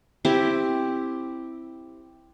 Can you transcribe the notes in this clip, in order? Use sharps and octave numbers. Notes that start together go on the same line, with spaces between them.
C4 E4 G4